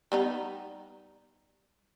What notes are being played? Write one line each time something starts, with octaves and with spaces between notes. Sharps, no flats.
G3 B3 D#4